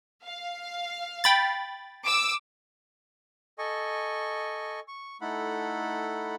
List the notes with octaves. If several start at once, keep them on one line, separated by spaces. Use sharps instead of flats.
F5
G5 B5 A6
D6 E6
A4 D#5 G#5 C#6
C#6
A3 D#4 E4 A4 F#5 B5